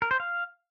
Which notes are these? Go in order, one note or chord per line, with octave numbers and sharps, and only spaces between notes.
A#4
C5
F5